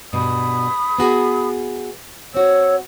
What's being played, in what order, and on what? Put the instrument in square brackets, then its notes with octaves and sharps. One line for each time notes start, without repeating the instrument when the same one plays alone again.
[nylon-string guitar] G2 B2 [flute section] B5 D#6
[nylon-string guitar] B3 F#4 G#4
[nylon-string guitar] C4 F#4 [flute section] C#5 E6